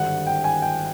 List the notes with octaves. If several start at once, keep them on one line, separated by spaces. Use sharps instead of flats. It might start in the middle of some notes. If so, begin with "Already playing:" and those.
Already playing: G#1 G2 D3 F#5
G5
G#5
G5